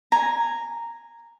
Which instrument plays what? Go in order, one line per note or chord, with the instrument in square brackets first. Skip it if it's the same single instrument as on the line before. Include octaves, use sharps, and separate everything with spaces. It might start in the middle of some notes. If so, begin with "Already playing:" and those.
[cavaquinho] G#5 A#5